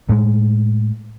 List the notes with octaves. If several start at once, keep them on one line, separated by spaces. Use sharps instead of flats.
A2 G#3